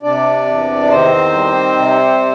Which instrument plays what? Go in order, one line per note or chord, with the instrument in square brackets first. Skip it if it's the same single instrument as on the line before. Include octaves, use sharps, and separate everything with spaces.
[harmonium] C3 D4 D5
E2
D#3 C4 C5
G3
C3